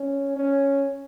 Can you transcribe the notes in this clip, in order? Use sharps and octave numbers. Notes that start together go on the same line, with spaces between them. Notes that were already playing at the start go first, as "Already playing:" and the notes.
Already playing: C#4
C#4